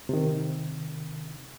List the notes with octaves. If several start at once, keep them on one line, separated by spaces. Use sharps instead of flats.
C3 D#3